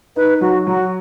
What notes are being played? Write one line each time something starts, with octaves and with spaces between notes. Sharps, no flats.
D#4 B4
F#3 F#4
F#3 F#4